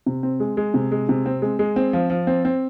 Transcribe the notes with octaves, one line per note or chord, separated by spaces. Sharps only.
C3
C4
G#3
G#3
C3
G#3
C3
C4
G#3
G#3
C4
F3
F3
C4
C4